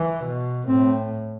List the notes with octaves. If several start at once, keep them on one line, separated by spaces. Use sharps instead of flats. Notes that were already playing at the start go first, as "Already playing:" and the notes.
Already playing: E3
B2
A2 C4